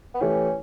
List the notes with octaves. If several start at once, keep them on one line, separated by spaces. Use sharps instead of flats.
B3
E3 A3 C#4 E4 G4